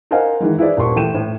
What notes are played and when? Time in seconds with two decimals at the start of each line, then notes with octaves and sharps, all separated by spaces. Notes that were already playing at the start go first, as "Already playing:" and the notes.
0.11 A#4 C5 D#5 F5 F#5 G#5
0.40 D#3 E3 G#3
0.58 E4 G#4 B4 C5 D5
0.77 D#1 A#3 B4 C6 C#6
0.95 E3 A3 G5 D#7 E7
1.15 A2